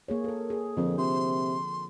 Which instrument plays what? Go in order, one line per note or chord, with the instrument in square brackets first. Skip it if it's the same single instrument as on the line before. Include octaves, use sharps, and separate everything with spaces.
[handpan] A#3 G#4 C#5
A4 A#4
G#4
[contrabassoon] F2 [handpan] D3 F3 C4
[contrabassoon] C3 [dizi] C6